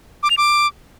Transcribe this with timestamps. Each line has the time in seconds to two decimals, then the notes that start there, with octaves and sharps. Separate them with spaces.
0.23 D6
0.30 F7
0.38 D6